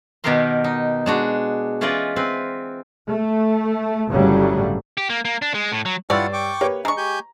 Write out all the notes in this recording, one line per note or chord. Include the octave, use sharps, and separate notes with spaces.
B2 D#3 B3 G4 A#4 C6
D#4
G#3 D4 F#4
E3 C#4 F4 B4 D5 D#5
C4 B4
A3
G1 A2 C#3 F#3 G3
G4
A#3
A#3
D4
G#3
A2
F#3
G2 E4 F4 G4 C#5 D5 F#5 E6
G5 C#6 D6
A#3 G4 B4 C#5
G#3 D4 A#5 C#6
G4 G#5 G6